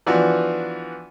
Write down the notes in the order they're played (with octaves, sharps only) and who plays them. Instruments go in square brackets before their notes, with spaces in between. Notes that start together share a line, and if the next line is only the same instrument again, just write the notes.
[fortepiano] E3 F3 B3 D4 F#4